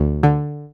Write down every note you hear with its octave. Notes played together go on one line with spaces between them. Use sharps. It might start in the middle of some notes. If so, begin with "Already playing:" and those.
Already playing: D2
D3